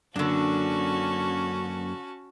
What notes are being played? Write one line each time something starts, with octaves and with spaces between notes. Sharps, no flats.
F#2 D3 A#3 C#4 D4 F#4 A5